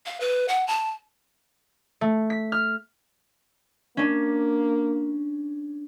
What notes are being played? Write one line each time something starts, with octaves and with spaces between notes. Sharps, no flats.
F5
B4
F#5
A5
A3
B6
F6
A#3 C#4 D4